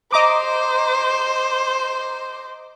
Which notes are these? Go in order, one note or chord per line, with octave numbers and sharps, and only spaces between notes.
C5 D#5 A#5 D6